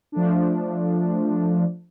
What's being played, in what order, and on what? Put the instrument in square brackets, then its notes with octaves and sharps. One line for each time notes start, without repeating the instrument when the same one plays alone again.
[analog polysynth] F3 A3 D4